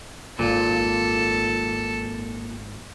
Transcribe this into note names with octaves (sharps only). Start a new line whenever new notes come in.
D#1 G#1 A#2 A4